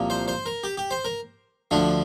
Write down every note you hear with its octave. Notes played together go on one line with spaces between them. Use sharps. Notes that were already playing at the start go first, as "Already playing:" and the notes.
Already playing: C2 A#2 F3 A#3
C5
C5
A#4
G4
G4
C5
A#4
D2 D3 F3 D4